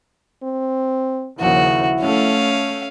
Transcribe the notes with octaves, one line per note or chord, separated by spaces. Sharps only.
C4
D#2 C#3 F3 E4 F#4
A3 C#4 F5